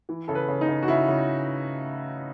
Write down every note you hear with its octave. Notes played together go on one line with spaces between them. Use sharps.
E3
C#3 A4
B4
C#3
D#4
C#3
F#4
C#3 E4
C#3